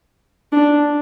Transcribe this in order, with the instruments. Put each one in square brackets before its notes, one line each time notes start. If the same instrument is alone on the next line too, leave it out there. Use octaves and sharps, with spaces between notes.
[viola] D4